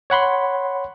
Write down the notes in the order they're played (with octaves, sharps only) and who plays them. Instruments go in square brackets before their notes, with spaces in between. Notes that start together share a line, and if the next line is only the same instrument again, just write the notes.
[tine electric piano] C#5 F#5 B5 C6